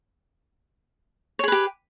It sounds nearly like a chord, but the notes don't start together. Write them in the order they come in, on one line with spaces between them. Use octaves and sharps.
C#5 G#4 B4 G4